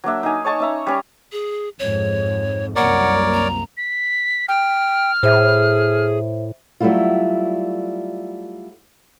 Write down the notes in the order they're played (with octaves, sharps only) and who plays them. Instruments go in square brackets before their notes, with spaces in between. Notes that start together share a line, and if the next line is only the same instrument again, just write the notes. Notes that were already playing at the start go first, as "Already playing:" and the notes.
[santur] F#3 A#3 D4 E5
D#4 F5 G#5
C#5 D#5 A5 C#6
C#4 E5 A#5
G3 C#4
[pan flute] G#4
[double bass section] F2 G#2 [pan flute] C#5
[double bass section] C2 F#2 A#3 [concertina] A#4 C#5 D5 [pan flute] F#5
[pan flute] A#5
[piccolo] B6
[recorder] G5 [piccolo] F6
[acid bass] A2 [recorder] G#4 [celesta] C5 E5
[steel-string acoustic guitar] F#3 G3 A3 E4 F4